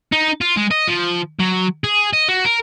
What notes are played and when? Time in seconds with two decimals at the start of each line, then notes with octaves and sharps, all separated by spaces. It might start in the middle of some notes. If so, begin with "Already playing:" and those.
0.12 D#4
0.41 F4
0.56 G#3
0.71 D#5
0.88 F3
1.39 F#3
1.84 G#4
2.13 D#5
2.28 F#4
2.45 A#4